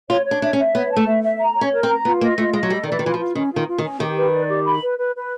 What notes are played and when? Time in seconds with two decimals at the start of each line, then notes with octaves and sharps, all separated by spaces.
0.09 F4 C#5
0.25 C#5
0.31 D4
0.42 D4 E5
0.53 C#4
0.58 E5
0.74 B3 C#5
0.91 A5
0.96 A3
1.07 E5
1.23 E5
1.40 A#5
1.56 C#5
1.61 C#4
1.73 A#4
1.83 C4
1.89 A#5
2.05 B3 F4
2.21 A#3 D#5
2.38 A3 F4
2.53 G#3 D#5
2.63 F#3
2.70 G3 A4
2.83 D#3
2.86 D5
2.92 E3
2.99 D#3
3.03 E3 F4
3.14 F3
3.18 F4
3.35 D#3 C#4
3.51 F4
3.56 D#3
3.67 F4
3.78 D#3
3.84 C#4
4.00 D#3 G4
4.17 B4
4.33 D5
4.49 G4
4.65 B5
4.81 B4
4.99 B4
5.15 B4